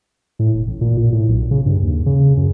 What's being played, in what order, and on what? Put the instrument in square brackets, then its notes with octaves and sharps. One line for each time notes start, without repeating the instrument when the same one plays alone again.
[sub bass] A2
E1
A1
A#2
A#2
A2
B1
C#3
G2
D#2
C#3
F#2